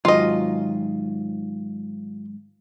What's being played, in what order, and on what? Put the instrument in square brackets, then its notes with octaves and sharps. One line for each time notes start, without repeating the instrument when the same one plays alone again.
[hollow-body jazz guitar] G#2 D#3 F#3 [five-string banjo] F4 D#5